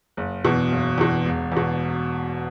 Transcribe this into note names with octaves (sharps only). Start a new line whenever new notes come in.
F#1
E2 B2
F#1
E2 B2
E1
E2 B2